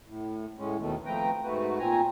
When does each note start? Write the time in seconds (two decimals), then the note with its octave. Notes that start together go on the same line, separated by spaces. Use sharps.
0.07 A2
0.58 A2 G#3 C#4
0.79 D#2 B2 D#3 A3
1.06 F3 A3 C4 B4 G5 A#5
1.44 G#2 A3 F#4 B4
1.79 A#2 C4 G#5 A#5